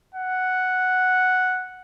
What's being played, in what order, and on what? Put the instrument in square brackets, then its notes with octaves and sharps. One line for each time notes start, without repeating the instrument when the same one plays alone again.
[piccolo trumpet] F#5